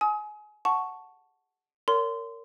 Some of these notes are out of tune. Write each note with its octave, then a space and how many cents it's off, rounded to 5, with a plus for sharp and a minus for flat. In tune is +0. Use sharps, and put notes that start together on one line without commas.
G#5 +25 D#6 +30
F#5 +0 A5 +0 C#6 +0
A#4 -20 C#5 +30 C6 -20